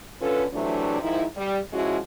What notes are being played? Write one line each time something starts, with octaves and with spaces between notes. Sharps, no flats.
D3 C#4 F4 A4 B4
C3 E3 F#3 A3 D4
G#2 D#3 F3 D#4 E4
G3
F3 G#3 C#4 E4 F#4